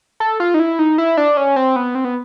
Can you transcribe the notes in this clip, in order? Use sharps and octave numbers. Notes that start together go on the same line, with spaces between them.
A4
F4
D#4
E4
D#4
E4
D4
C#4
C4
B3
C4
B3